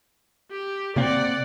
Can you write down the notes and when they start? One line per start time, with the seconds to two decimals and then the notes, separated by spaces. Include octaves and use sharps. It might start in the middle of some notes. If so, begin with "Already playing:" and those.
0.51 G4
0.96 C3 A#3 C4 D5 F#5